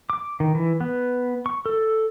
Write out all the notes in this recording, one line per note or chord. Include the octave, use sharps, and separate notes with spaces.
D6
D#3
E3
B3
C#6
A4